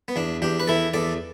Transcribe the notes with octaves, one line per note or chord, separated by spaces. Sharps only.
B3
E2 D4
E2 D4 G4
B4
E3 E4 A4
E2 A4 D5